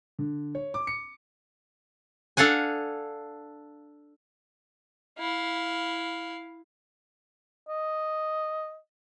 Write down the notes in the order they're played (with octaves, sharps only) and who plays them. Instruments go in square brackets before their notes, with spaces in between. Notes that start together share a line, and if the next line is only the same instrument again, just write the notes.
[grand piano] D3
C#5
D6
C#7
[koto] D4 A4 F5 F#5 G#5
[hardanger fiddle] E4 F5
[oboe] D#5